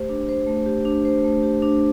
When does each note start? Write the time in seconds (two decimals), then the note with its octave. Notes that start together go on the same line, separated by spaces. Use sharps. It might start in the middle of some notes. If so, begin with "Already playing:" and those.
Already playing: A3 G4 C5
0.09 D4
0.29 C5
0.47 A3
0.66 G4
0.85 D4
1.05 C5
1.25 A3
1.43 G4
1.62 D4